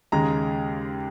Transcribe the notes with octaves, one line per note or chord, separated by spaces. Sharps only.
D#2 C#3 G#3 A#5